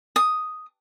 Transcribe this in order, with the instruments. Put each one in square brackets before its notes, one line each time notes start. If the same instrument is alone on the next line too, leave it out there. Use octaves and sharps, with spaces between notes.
[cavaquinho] D#6